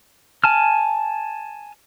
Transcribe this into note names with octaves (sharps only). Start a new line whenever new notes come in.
G#5 A5 F6